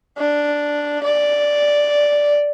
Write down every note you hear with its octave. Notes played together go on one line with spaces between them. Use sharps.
D4
D5